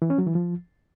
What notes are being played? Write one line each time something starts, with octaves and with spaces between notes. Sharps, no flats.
E3
C#4
F#3
E3
F3